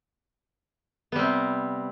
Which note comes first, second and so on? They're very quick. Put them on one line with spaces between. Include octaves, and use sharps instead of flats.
B3 G3 C4 C3